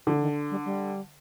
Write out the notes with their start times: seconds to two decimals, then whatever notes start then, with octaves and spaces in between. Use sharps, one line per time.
0.06 D3 F3
0.21 D#3
0.51 G3
0.65 G3